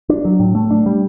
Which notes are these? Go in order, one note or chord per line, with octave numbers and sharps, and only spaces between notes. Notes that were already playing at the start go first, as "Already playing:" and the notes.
D4
F#3
A2
A3
D4
G3